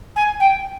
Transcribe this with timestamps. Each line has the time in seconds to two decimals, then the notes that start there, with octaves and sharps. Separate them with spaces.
0.16 G#5
0.40 G5